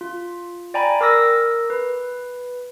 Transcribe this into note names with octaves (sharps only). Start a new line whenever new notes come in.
F4
D5 G5 G#5 A#5 B5
A#4 D6 E6 A#6
B4